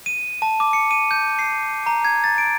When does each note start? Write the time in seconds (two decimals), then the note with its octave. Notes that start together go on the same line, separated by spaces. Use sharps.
0.06 D#7
0.42 A5
0.60 D6
0.73 C#7
0.91 D#7
1.11 G6
1.39 C7
1.86 A#5
2.05 G#6
2.24 A6
2.38 D7